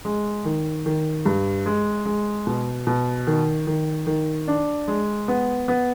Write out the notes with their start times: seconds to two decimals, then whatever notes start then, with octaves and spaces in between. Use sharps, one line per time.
0.05 G#3
0.45 D#3
0.86 D#3
1.26 G2
1.66 G#3
2.05 G#3
2.47 B2
2.87 B2
3.27 D#3
3.67 D#3
4.07 D#3
4.48 D4
4.88 G#3
5.28 B3
5.68 B3